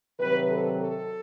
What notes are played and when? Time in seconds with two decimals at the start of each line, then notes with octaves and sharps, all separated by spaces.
0.19 C3 D#3 F#3 B4
0.49 A4
0.80 A4